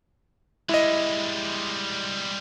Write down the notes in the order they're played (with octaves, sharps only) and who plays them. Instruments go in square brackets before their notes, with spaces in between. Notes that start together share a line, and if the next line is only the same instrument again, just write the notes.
[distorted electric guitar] G3 G#3 [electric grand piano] E4 D#5